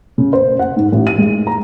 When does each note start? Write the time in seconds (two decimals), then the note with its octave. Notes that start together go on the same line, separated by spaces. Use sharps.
0.18 C#3
0.33 C5
0.59 F#5
0.76 G#2
0.92 A1
1.07 D#7
1.18 G#3
1.47 A#5